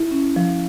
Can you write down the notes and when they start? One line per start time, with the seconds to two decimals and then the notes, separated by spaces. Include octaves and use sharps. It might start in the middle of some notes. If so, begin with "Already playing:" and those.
Already playing: E4
0.11 C#4
0.36 F3